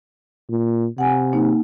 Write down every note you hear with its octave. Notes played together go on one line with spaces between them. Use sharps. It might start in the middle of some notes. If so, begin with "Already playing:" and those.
A#2
C3 F#5 G#5
A#3 D#4